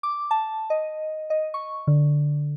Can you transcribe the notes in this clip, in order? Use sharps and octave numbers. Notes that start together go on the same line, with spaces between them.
D6
A5
D#5
D#5
C#6
D3